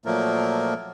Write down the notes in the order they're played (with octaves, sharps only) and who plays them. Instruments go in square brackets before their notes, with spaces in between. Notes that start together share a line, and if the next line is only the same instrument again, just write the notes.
[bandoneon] A#2 F3 F#3 A3 A#3 A#4